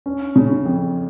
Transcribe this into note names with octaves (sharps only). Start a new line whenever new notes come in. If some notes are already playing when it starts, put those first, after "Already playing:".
C#4
C#3
F2